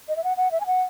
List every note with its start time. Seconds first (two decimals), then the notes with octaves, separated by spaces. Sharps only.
0.08 D#5
0.16 E5
0.24 F#5
0.37 F#5
0.51 E5
0.60 G#5
0.66 F#5